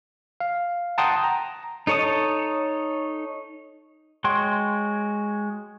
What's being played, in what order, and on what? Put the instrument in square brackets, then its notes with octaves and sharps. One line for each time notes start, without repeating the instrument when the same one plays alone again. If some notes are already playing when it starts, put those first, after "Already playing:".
[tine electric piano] F5
F#5 G5 A5 A#5 C6 D#6
A#5
[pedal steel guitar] D#4 A4 C#5 A5 D#6
G#3 F#4 C#5 G5 C6